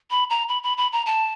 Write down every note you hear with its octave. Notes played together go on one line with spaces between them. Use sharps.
B5
A#5
B5
B5
B5
A#5
A5